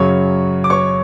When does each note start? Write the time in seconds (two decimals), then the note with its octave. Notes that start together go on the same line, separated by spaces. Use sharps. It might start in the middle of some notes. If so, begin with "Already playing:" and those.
Already playing: F#2 C#3 F#3 C#5 C#6
0.64 D6
0.70 C#5 C#6